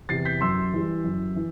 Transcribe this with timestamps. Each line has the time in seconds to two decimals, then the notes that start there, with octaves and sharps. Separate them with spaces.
0.09 E2 C3 A6 C7
0.25 G6 B6
0.41 F#2 C6 E6
0.73 E3 G3
1.04 F#2
1.36 E3